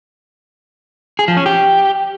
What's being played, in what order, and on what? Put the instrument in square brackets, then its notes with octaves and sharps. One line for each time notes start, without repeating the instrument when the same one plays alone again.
[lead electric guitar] G#4
F3
C#4
G4